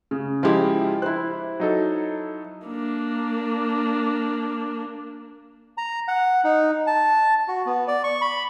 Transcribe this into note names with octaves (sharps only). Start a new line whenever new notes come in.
C#3
F3 G#3 E4 F4 G4
E4 C5 F#6
F#3 D#4 A4
A#3 D4
A#5
F#5
D#4
A5
F#4
B3
D5
C#6
B5